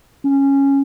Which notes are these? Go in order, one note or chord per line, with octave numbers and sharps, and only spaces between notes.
C#4